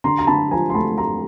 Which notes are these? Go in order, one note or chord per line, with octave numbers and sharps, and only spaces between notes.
D3 A#5 C6
A#5
D3 A5 B5
F3 G#5 A#5
C6
A3 A5 B5
A3 A#5 C6